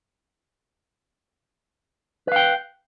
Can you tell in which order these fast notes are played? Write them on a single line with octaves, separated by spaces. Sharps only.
B4 F5 G5